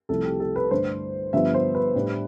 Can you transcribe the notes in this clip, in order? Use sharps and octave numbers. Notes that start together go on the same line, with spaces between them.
C2 C3 F3 A3 A4
G4
A4
B4
G2 D3 A3 D4 C5
G2 D3 F3 B3 E5
C5
B4
A2 G3 D4